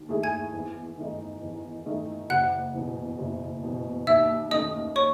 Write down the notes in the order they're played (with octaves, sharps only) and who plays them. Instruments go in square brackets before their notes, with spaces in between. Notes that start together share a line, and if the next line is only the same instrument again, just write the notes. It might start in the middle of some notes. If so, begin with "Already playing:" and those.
Already playing: [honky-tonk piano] D#2
D#3 A3 E4 G#4
[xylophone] G#5 G#6
[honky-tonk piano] E2
D#3 A3 D#4
E2
D#3 A3 D#4
[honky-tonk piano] F#1 [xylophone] F#5 F#6
[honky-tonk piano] E2 B2
F#1
E2 B2
[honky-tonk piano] D#2 [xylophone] E5 E6
[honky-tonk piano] D#3 A3 C#4 [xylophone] D#5 D#6
[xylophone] C#5 C#6